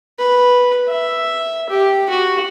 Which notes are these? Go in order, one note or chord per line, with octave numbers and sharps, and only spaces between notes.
B4
E5
G4
F#4